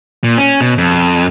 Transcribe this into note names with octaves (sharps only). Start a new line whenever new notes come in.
A#2
C#4
B2
F2